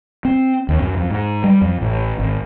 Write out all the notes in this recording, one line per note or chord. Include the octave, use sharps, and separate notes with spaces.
C4
D#2
F#2
F2
G#2
G3
F2
A1
G#1